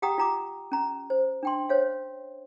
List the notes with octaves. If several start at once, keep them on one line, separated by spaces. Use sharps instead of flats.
G4 F#5 G5 A#5 D#6
F4 A#5 D6
C#4 A#5
C5
D4 G5 C6
C5 C#5 F5